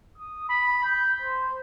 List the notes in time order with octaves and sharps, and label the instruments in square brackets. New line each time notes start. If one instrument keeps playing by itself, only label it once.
[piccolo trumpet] D#6
B5
G6
C5